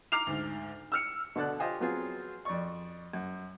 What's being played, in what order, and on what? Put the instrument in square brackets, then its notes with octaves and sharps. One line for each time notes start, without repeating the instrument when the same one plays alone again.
[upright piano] A#5 D6 F6 C7 F7
D2 G#2
E6 F6 C#7
[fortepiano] B2 D3 A4 D5 F#6
F4 G4 C5 D#5 F5 G#5
F#3 B3 C4 F4 G#4
F2 D5 C#6
F#2